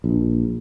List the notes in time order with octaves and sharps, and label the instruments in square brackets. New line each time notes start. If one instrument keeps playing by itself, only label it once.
[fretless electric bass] A#1